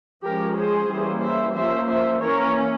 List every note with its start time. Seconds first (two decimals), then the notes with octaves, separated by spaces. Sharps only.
0.25 F3 G#3 C#4 G4 A#4
0.58 G#4 C5
0.91 E3 G3 A#3 C#4
1.23 C5 E5
1.56 F3 A#3 C#4 C5 E5
1.89 C5 E5
2.22 E3 A#3 C#4 A#4 C#5